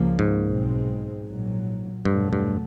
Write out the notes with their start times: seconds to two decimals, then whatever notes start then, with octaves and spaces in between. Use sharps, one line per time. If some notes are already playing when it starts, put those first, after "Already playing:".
Already playing: C#2 C#3 F3 A#3
0.19 G#2
0.46 B1 B2 G#3 C4
1.25 A#1 A#2 F#3
2.05 E2 G2 B2 F#3 A3
2.33 G2